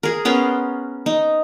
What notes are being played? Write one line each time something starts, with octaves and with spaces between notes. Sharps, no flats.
G#4 A#4
B3 C#4 A#4 C6
D#4